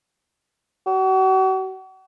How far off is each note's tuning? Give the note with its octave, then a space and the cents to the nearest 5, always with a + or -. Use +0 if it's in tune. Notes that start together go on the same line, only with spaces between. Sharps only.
F#4 +40